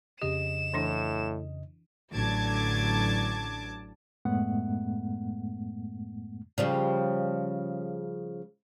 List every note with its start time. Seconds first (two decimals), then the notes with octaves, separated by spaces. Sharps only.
0.22 F2 C#3 G4 D#5 E7
0.74 A2 E3 D4 E4
2.12 A1 D3 F#3 A5 D6 G#6
4.25 F#2 A2 G#3 A3 B3 F#5
6.58 C#3 F3 G3